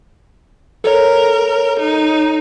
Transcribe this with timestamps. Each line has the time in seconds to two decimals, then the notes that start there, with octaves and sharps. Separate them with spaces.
0.84 A4 A#4 C#5
1.80 D#4